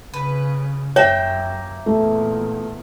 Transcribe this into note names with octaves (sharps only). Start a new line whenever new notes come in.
C#3 B4
F#2 A#3 C#5 E5 G5
E2 A#2 A3